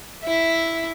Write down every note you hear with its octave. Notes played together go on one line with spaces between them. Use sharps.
E4 E5